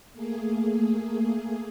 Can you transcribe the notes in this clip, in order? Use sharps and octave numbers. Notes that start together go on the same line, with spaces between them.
A3 A#3 G#4